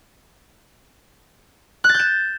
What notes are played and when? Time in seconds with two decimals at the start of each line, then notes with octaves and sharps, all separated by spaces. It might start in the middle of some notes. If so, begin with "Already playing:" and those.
1.84 F#6
1.89 A6
1.94 G6
1.99 E7